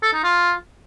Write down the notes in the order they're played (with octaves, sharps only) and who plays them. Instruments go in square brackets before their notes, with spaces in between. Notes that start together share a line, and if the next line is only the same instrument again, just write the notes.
[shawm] A4
D#4
F4